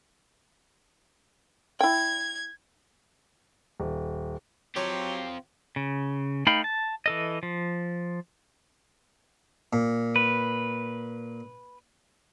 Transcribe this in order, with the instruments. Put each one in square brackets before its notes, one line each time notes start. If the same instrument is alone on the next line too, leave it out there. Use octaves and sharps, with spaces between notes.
[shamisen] E4 G5 [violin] G#6
[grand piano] D#1
[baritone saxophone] F#3 [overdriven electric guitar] C4 F4 [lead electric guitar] G4 [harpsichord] C#5
[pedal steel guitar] C#3
A3 D#4 F5 G5 B5
A5
E3 A4 D#5
F3
[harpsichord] A#2
[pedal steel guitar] B4